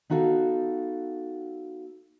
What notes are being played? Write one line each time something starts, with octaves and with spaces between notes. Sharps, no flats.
B3 D#4 F#4 A4 F5